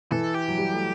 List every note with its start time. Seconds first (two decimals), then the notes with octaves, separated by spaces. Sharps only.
0.12 E3 A4
0.34 G4
0.48 F#3
0.57 G3
0.73 A3